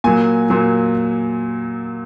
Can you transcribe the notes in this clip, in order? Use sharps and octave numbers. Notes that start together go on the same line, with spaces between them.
A#2 F#3 G#5
A#2 F#3